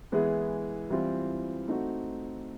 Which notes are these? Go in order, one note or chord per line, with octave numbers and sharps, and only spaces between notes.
E3 G#3 B3 E4 G#4
E3 G3 C4 F4
A3 C4 D#4 F#4